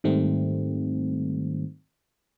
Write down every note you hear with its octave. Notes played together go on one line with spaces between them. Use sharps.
G#2 D#3 G3 A3 C4